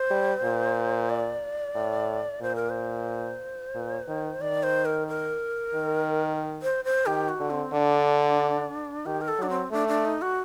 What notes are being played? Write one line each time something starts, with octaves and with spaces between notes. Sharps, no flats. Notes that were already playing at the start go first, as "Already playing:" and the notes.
Already playing: C5
G3
A#2
D5
A2
A#2 C5
A#4
C5
A#2
D#3
D#3 D5
C5
A#4
A#4
D#3
C5
C5
D#3 G4
F#4
D3
C4
D3 D4
D#3 G4
A#4
A4
F#3 D4
C4
A3 D4
D4
D#4
F#4